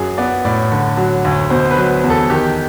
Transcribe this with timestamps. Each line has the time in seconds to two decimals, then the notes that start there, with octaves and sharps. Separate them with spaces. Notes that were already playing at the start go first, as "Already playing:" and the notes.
Already playing: F#2 F#3 G#4
0.18 B3 D5
0.45 A2 D5
0.72 D3
0.97 F#3
1.25 D2
1.50 B2 C5
1.71 B4
1.77 F#3
2.04 E2
2.10 A4
2.30 D#3 G4